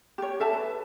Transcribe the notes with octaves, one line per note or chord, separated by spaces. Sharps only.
G4 C#5
A4 E5 A5
B4